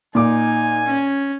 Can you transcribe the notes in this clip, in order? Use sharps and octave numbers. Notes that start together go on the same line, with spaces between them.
A#2 D#4 G#5 D6
C#4